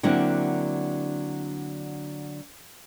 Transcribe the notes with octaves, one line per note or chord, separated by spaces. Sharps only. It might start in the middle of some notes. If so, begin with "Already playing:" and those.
D3 F#3 A#3 C4 D4 E4